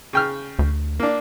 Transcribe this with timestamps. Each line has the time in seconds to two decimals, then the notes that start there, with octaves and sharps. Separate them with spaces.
0.13 C#3 G5 F6
0.59 D2
1.00 A#3 D4